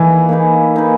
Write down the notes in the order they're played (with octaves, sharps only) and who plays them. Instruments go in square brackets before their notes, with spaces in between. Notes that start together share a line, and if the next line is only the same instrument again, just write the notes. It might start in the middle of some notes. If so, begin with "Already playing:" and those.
Already playing: [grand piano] E3 [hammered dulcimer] A#3 D#4 G#4 B4
[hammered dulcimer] A#3 D#4 G#4 B4
A#3 D#4 G#4 B4